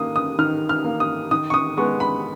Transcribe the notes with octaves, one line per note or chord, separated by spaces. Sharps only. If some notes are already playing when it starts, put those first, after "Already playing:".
Already playing: D#3 A#3 D#6
D#6
D#3 F6
F6
A#3
D#6
D#3 D#6
C#6
D#6
G#3 B3 C#6
B5